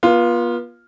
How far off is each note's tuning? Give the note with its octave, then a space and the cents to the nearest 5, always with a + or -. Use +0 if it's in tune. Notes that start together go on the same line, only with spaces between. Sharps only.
B3 -40 F4 +0